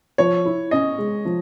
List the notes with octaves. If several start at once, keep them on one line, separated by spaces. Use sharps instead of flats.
F3 C#5
E4
C#4 D#5
G#3
F3